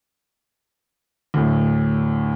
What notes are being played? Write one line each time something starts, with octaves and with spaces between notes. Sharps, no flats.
D2 A2